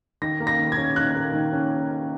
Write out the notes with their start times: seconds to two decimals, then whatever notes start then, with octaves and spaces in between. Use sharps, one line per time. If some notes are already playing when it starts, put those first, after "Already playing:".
0.22 D#3 A#6
0.40 A#3
0.47 A#6
0.59 D#3
0.72 G#6
0.77 C#4
0.96 D#3 F#6
1.15 A#3
1.34 D#3
1.52 C#4